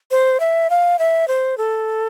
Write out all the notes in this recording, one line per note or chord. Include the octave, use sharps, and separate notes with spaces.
C5
E5
F5
E5
C5
A4